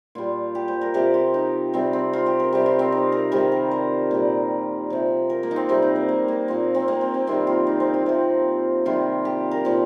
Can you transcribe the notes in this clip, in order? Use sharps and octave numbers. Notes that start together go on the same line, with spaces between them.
A#2 G3 F4
G4
C5
A#4
C3 F3 G4
F4
D#4
C3 G3 C4
C4
F4
G4
A#4
C3 G3 G4
F4
C4
D#4
A#4
C3 D#3 G3 A#4
A#4
C5
A#2 G3
C3 F3
A#4
A#3
D#4
C4
C3 G3 C4
D#4
A#3
A#3
A#3
A#2 F3 C4
C4
A#3
C4
C4
C3 D#3 G3 C4
F4
D#4
C4
F4
C3 F3
C3 D#3 G3 F4
G4
A#4
A#2 F3